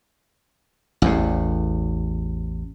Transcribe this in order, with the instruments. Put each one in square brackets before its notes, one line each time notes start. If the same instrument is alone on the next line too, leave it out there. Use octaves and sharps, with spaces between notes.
[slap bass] A1 E2 A2